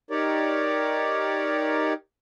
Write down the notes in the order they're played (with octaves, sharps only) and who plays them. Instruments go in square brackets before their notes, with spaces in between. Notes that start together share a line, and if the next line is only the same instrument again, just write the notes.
[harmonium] D#4 G4 A#4 C#5 D5